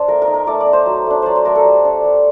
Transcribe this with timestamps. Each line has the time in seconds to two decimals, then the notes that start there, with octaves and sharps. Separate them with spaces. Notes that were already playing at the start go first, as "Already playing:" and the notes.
Already playing: D4 C5 D5
0.08 A3 A#4
0.22 A#4
0.27 D#4
0.34 A#4
0.47 A3 D5
0.60 D5
0.66 D#4
0.73 C5
0.86 F#3
1.06 A3 D4
1.22 F#3 C5 D5
1.36 C5
1.45 A3 D4 A#4
1.55 A4
1.65 G3
1.85 D4
2.04 G3